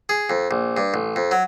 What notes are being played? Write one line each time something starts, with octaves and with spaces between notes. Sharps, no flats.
G#4
F2
A#1
G2
A1
F2
F#3